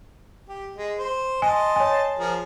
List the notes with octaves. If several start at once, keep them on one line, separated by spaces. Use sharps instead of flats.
G4
G#3
C5
D#5 G#5 A5 C6
C#5 G#5
F3 G#4 A#4